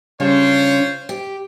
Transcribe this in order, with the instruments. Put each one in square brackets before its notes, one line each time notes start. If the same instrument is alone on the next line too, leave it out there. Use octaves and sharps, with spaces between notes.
[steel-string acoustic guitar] C#3 G3 D4 [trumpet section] F4 C5 C#5
[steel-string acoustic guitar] G4